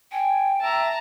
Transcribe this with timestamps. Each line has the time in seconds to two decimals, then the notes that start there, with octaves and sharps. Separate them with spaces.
0.12 G5 G#5
0.61 E5 A5 A#5